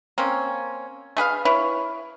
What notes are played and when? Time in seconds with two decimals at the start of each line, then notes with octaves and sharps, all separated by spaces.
0.18 A#3 C4 C#4
1.17 A3 G#4 B4 F5
1.45 E4 B4 C#5